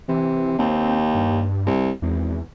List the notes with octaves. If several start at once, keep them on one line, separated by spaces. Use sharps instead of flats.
C3 E3
D#2 C4
G2
C2
G#1 E2